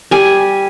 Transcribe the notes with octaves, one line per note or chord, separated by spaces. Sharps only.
G3 G#5